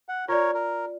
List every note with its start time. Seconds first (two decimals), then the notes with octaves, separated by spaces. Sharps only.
0.09 F#5
0.28 F4 A#4 C#5 D5
0.54 A#4